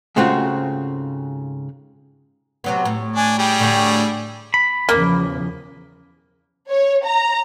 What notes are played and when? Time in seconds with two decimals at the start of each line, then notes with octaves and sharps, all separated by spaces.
0.16 G#2 C#3 A3 C4 F4 F#4
2.64 C3 F#3 B3
2.85 A2
3.16 D4 G#5
3.39 G3 G#4 G5
3.59 A2 D3 D4
4.54 B5
4.89 E2 C#3 F3 A#3
6.71 C#5
7.05 A#5